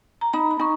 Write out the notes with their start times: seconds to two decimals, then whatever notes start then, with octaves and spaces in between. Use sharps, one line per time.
0.21 A#5
0.33 D#4 B5
0.51 B5
0.59 D#4 C#6